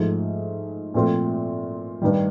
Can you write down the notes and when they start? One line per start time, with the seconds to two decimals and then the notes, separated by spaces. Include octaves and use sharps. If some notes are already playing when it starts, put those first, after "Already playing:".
Already playing: G#2 F3 A3
0.94 A#2 F3 A3 C4 F4
2.02 G2 D#3 G3